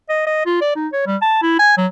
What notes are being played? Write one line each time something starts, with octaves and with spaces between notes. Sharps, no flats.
D#5
D#5
F4
D5
D#4
C#5
G3
A5
E4
G#5
F#3